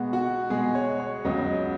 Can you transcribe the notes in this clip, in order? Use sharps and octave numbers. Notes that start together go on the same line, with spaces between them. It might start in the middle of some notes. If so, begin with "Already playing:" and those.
Already playing: B2 G#3 B3 F#4
F#4
B2 G#3 B3 G#4
C#5
C#5
C#2 C#3 F#3 B3 D#5